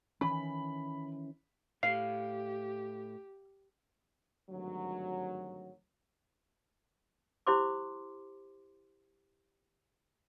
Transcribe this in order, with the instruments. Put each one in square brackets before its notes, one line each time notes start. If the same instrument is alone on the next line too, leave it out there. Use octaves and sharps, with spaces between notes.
[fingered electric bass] D#3 E3 C#4 [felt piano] B5
[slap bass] A2 [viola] G4 [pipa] F5 [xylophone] C7
[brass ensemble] G#1 D2 G2 F#3
[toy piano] E4 G4 C5 C6 D6